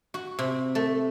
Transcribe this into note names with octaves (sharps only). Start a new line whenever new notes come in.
F#4
C3
A3